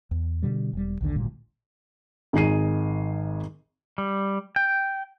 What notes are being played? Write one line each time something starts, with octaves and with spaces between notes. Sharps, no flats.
E2
B2 D3 G3
E1 G3
A#1 D#2 D3
G#1 D2 A#2 G3
G#1 D#4 G#4 C7 D#7
G3
G5